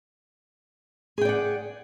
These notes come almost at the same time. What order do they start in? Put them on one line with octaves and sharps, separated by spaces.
G#4 G5 D5 F#5